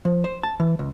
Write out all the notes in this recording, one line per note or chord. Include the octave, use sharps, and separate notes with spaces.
F3
C5
A5
E3
C#2